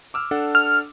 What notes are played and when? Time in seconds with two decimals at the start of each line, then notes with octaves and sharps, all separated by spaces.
0.14 D6 E6 F6
0.31 D4 A4 F#5
0.55 F6